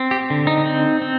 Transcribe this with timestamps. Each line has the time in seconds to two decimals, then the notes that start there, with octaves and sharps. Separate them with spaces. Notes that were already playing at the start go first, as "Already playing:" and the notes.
Already playing: C4
0.11 G4
0.30 D3
0.47 D#4
0.66 C4
1.02 C4